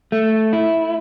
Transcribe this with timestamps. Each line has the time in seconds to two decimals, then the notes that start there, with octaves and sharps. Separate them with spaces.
0.12 A3
0.53 E4